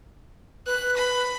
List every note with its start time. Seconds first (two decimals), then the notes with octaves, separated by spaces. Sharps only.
0.66 B4 F#6
0.96 B5